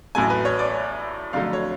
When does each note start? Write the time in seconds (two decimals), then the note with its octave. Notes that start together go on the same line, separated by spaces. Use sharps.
0.15 A1 A2 F#3 A3 G#5
0.30 B4
0.45 C#5
0.59 D5
1.33 F2 D3 F#3 A3 F5
1.53 C#5